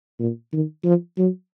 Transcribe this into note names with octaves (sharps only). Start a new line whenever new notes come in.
A#2
D#3
F3
F#3